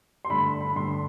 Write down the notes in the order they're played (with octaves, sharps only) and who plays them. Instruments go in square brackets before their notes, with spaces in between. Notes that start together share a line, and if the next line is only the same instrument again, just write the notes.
[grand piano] C6
[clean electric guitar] G2 D3 A3 D4 [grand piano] B5
[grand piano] B5
[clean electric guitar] G2 D3 A3 D4 [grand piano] C6